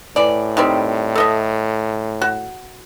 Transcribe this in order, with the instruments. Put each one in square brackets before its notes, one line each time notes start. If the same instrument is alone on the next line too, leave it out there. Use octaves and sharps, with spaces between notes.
[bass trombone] A2 [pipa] E3 D5
[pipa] D#3 G3 C4
A4 D#5 E5
F#4